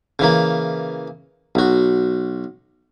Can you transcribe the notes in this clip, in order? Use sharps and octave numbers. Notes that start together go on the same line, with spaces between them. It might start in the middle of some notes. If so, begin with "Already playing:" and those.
C#3 E3 A#3
B1 F#4